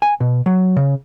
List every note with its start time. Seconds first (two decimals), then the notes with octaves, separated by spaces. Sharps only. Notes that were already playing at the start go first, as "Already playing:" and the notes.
0.02 G#5
0.20 B2
0.46 F#3
0.77 C#3